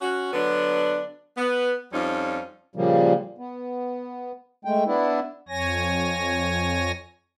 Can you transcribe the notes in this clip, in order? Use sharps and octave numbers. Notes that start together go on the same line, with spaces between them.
C#4 F#4
D3 F#3 B3 D4
B3
F2 F3 G3 C#4 D#4
A#2 C#3 F3 G3 A#3
B3
G#3 A3 G5
B3 D4 E4
F2 C#5 G#5 A#6